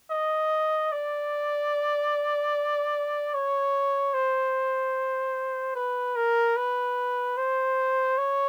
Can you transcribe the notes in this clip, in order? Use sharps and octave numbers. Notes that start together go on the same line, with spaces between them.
D#5
D5
C#5
C5
B4
A#4
B4
C5
C#5